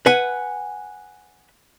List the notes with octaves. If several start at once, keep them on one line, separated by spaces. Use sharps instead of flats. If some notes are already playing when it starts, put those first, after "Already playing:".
B4 F#5 G#5